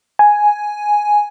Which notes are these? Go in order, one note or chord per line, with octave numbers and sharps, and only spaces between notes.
G#5